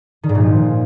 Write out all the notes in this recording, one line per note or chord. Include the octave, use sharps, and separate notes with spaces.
D#3
G#2
A#2
F3